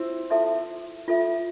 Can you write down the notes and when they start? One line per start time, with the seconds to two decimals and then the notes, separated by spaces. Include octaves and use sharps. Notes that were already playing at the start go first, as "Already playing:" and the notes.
Already playing: C4 E4 F4
0.30 F4 A4 E5 A5 C6
1.08 F4 A4 E5